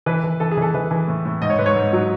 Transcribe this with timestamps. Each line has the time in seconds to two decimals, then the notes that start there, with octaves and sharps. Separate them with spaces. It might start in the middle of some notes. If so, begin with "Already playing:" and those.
0.06 E3 B4
0.24 E3
0.40 E3 A4
0.51 G#4
0.57 E3 A4
0.74 E3 B4
0.91 E3
1.08 A2
1.25 A2
1.41 G#2 D#5
1.50 C#5
1.59 G#2 B4
1.66 C#5
1.76 G#2
1.93 F#3